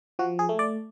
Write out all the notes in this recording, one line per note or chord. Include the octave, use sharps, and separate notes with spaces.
F3 F#4
G#4
A3
D5